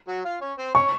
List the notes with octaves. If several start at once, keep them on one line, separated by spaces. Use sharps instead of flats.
F#3 F#4
F4 F5
C#4 C#5
C4 C5
C#4 C#5 C#6